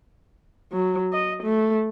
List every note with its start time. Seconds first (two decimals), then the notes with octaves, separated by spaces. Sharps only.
0.72 F#3
1.13 D#5
1.43 A3